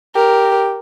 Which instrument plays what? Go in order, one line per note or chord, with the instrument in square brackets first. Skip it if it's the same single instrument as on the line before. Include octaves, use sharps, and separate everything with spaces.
[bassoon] G4 [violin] A#4